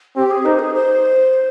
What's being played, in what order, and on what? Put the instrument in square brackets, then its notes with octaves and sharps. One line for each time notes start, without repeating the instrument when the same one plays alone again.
[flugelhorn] C4 [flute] G4
[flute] G#4
[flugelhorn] D#4 [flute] C5
[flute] G#4
C5